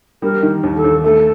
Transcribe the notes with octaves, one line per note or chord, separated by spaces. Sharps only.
G3 A#4
D#3
D#2
A4
D#2
A3 A4